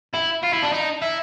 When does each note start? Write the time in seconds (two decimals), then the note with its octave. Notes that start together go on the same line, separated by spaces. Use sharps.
0.14 E4
0.43 F4
0.53 E4
0.62 D4
0.72 D#4
1.02 E4